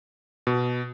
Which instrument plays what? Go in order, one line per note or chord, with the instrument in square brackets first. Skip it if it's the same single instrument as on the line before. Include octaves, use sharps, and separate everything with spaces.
[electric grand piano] B2